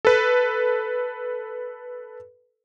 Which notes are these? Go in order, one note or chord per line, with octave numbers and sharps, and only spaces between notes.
A4 B4